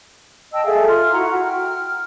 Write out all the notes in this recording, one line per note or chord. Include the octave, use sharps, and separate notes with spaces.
D#5 G5 A5 E6
G#4 A4 E5 F5
F4 C6 F6
E4 F#4 F#5 A#5
G5 F6